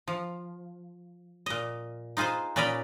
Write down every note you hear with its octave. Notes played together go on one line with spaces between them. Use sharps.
F3
A#2 D#5
D#4 F4 G#4 B4 C5
A#2 C#4 D5 D#5 B5